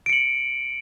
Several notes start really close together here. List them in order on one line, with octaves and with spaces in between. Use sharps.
D7 C#7 F#7